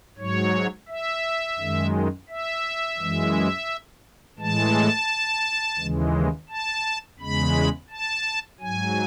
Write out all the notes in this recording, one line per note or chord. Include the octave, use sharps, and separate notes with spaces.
G#2 F#3 C#5
E5
F#2 D#3 G#3
E5
F#2 E3 G#3
A2 E3 G#3 A5
D#2 C#3 E3 G#3
A5
E2 C#3 G#3 B5
A5
G#2 F#3 G#5